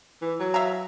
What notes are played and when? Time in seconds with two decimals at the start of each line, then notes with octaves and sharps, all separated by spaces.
0.22 E3
0.40 F#3
0.54 E5 F5 A#5